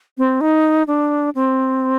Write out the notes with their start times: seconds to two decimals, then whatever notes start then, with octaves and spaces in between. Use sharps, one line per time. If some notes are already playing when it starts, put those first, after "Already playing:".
0.18 C4
0.41 D#4
0.87 D4
1.35 C4